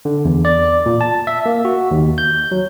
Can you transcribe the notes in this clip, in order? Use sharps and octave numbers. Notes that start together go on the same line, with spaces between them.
D3
E2
D5
A#2
A5
E5
A#3
F#4
D#2
G6
F#3